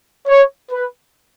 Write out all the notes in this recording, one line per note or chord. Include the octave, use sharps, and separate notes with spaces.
C#5
B4